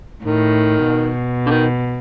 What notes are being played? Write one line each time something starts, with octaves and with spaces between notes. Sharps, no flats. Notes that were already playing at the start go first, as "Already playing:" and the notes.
A2 D#3
B2
D3
D#3